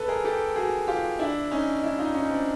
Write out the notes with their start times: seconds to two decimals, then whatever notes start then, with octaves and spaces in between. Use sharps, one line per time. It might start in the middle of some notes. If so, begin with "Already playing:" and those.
Already playing: A4 B4
0.08 G#4 A#4
0.24 G4 A4
0.56 F#4 G#4
0.87 F4 G4
1.19 D4 E4
1.51 C#4 D#4
1.83 D4 E4
1.98 D#4 F4
2.14 C#4 D#4
2.30 C4 D4